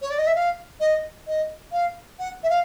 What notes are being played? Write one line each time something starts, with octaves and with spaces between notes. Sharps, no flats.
C#5
D5
D#5
E5
F5
D#5
D#5
F5
F#5
E5
F5